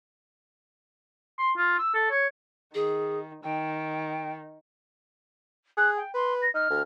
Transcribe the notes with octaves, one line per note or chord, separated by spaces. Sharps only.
C6
F4
E6
A4
C#5
D#3 G#4
D#3 G5
G#4 F#6
G5
B4 C6
A#6
D#4 F6
D2